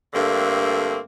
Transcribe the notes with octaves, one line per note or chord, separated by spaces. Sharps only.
G2 D3 A3 A#3 C4